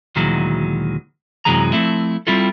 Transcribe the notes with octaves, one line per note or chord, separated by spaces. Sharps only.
D2 A#2 D#3 E3 F#3 G#3
F#2 C3 E3 F#3 G#3 A#5
F3 A3 C4 E4
G3 C4 E4 F4 A4